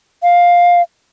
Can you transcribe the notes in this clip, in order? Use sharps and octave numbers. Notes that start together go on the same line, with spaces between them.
F5